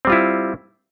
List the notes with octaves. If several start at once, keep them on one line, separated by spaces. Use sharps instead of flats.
G3 C4 E4 F4